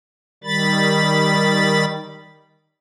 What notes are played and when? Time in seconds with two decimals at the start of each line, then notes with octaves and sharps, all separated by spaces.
0.44 D#3 G3 B5 A6